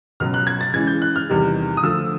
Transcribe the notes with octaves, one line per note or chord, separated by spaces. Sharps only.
C#2 B2 F#3 F6
F#6
G#6
A6
C#3 E3 G#3 G#6
G6
F#6
F6
E2 C3 D#3 G3
D#6
D2 D3 F3 A3 E6